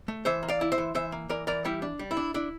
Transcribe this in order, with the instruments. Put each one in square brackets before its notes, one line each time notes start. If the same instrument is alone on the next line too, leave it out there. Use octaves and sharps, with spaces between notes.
[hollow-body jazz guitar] A3
E3 C5 E5
A#3
D5 F5
E4
C5 E5
E3
E3 C5 E5
A#3
E3 A#4 D5
E3 A#4 D5
G3 E4 G4
D4
G3
E4
D4
D4 E4